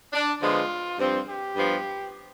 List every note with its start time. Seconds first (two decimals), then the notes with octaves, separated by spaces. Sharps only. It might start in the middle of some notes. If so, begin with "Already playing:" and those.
0.13 D4
0.42 D3 F3 G#3 B3 F4
0.99 G2 F3 C4
1.28 G4
1.56 G2 F3 B3